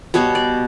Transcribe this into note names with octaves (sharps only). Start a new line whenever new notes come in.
B2 G3 B3 C#5
D5